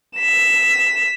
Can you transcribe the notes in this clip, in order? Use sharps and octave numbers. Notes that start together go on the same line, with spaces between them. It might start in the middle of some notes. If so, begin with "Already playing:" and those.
B6 E7